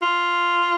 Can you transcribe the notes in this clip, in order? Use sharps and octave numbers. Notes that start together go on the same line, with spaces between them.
F4